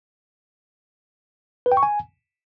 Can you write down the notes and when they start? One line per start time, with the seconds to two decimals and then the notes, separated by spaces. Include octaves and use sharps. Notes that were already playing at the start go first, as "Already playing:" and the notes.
1.66 B4
1.72 G5
1.77 C#6
1.83 G#5